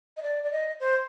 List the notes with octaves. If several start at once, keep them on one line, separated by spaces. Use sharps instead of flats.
D#5
D5
D5
D#5
C5